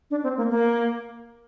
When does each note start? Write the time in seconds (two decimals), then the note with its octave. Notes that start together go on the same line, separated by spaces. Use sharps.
0.11 D4
0.23 C4
0.37 A#3
0.50 A#3